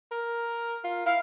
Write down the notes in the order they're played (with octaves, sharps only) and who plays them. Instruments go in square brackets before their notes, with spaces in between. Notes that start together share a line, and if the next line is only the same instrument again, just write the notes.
[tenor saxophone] A#4
F4
[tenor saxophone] E4 [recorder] F5